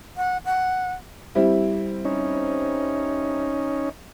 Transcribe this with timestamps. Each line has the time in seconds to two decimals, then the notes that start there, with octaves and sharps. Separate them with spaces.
0.17 F#5
0.45 F#5
1.35 G3 C4 E4
2.05 C#4 D#4